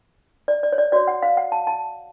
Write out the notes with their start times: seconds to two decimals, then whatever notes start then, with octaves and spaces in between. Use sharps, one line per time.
0.48 D5
0.63 D5
0.72 C#5
0.78 D5
0.92 F#4 C#5 D5
1.07 F#5
1.22 F5
1.37 F#5
1.52 A5
1.67 A5